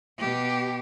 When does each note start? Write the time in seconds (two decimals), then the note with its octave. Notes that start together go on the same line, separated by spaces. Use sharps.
0.18 B2 G4